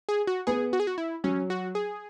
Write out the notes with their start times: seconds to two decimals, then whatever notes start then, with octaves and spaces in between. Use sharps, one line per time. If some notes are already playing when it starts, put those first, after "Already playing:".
0.09 G#4
0.27 F#4
0.47 B3 G#4
0.73 F#4
0.80 G#4
0.87 F#4
0.98 E4
1.24 F#3 C#4
1.50 F#4
1.75 G#4